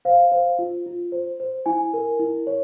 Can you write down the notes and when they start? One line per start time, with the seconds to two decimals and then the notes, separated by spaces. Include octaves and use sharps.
0.05 C5 F5
0.32 C5
0.59 F4
0.86 F4
1.12 C5
1.40 C5
1.66 E4 G#5
1.94 A#4
2.19 E4
2.47 C#5